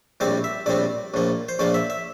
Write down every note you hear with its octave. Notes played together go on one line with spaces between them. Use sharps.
A#1 A2 G3 C4 D5
E5
A#1 A2 G3 C4 D5
A#1 A2 F3 A#3
C5
A#1 A2 F3 A#3 D5
E5
E5